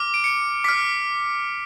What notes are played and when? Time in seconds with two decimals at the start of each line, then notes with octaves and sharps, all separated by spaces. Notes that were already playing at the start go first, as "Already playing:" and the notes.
Already playing: D6 F6
0.14 D7
0.24 C#7
0.64 D6 F6 B6